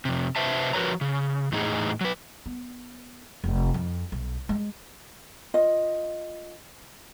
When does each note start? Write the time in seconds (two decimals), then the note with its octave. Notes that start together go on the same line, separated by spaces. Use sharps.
0.05 F2 C3
0.36 C3 B4 C5 E5 A5
0.73 F3 F#4 A#4 B4 C#5 A#5
1.01 C#3
1.52 E2 A2 D#4 G#4
2.01 F#3 B4
2.46 B3
3.44 F1
3.74 F2
4.12 B1
4.49 G#3
5.54 F4 D#5